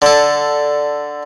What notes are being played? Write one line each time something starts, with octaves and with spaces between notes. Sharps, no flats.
D3 A4